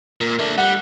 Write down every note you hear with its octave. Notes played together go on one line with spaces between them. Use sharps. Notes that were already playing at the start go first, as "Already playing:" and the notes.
A#2 A#4
A3 D4
G3 F#5